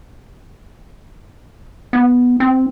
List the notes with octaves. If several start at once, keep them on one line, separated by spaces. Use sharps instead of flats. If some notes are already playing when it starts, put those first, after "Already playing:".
B3
C4